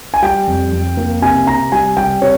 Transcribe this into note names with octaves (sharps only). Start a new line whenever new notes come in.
G#5
G3 G5
F2
F2
A#3
C3 G#5
C3 A#5
G3 G#5
G3 G5
C3 C#5